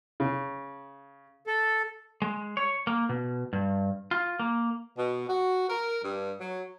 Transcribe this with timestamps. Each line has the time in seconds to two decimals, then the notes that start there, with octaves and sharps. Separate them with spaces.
0.20 C#3
1.47 A4
2.22 G#3
2.57 C#5
2.87 A#3
3.09 B2
3.53 G2
4.11 F4
4.39 A#3
4.97 B2
5.28 F#4
5.69 A#4
6.03 G2
6.41 F#3